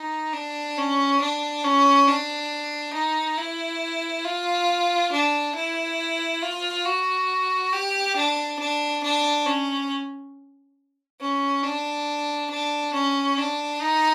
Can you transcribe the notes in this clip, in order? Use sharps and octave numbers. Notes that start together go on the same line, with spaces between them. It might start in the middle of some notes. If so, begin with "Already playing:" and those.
Already playing: D#4
D4
C#4
D4
C#4
D4
D#4
E4
F4
D4
E4
F4
F#4
G4
D4
D4
D4
C#4
C#4
D4
D4
C#4
D4
D#4